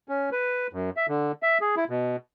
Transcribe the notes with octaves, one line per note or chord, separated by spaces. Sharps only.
C#4
B4
F#2
E5
D3
E5
G#4
E4
B2